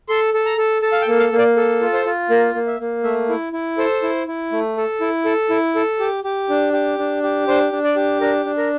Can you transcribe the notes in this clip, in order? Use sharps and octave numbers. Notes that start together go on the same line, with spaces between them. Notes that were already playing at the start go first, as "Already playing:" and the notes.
A4 C6
A4
A#5
A4
A4 A5
F5
G5
A#3
F5
A#3
D5
A4
F4
C5
F4
A#3 A#4
A#3
E5
A#3
A3 E5
E4
E4
A4 C5
E4
E4
A3
A4
E4
A4
E4
A4
G4
G4
D4
G4
D4
G4
D4 C5
D4
D5
G4
D4 A#4
D4
A#4